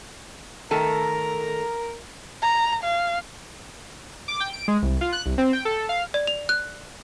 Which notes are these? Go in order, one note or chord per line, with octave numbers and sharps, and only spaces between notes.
D#3 A3 A4 A#4 A#5
A#5
F5
D6
G5
D7
G#3
C2
F4
F#6
C2
C4
G5
A4
F5
D5
F7
F#6